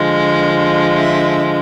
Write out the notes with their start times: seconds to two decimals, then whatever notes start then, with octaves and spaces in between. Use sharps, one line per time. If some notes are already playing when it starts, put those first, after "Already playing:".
Already playing: D3 F3 G#3
0.98 E5